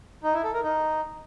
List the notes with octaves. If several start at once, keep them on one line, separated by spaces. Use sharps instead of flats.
D#4
E4
A4
A#4
D#4